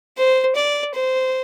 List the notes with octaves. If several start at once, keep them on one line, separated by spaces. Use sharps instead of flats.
C5
D5
C5